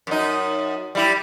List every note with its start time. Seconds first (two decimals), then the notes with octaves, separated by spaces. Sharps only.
0.07 F#2 D#4
0.95 G3 E4